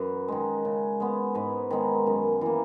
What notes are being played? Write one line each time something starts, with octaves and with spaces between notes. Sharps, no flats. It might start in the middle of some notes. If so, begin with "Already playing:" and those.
Already playing: F#2 B4
D#3 G#3
C#3
G#3 B3
G#2 B4
D#3 G#3 B3
F#2
E3 A#3